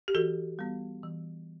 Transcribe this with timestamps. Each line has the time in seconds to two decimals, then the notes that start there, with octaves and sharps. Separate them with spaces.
0.08 G4
0.15 E3 F#4 A4
0.59 G3 B3
1.03 E3